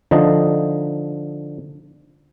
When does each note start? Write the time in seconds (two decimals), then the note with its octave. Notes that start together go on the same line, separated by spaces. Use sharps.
0.11 D3 F3 D#4 D#5